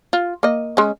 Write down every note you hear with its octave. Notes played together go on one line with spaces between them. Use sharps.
F4
A#3 D#5
G#3 C#4